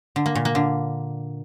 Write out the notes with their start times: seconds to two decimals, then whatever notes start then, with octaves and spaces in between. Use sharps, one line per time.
0.16 D3
0.26 A#3
0.35 A#2
0.45 A#3
0.55 D3